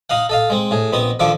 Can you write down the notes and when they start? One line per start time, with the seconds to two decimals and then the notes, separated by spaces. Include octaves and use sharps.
0.10 D#4 D#5 F5 F#5
0.29 A4 D#5 F5
0.50 G#3 C4
0.71 A2 G#4
0.92 A#1 B3 C4 D#5
1.20 D3 D#3 F3 E5 D6